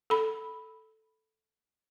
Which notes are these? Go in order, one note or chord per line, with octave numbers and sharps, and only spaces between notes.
A4 B5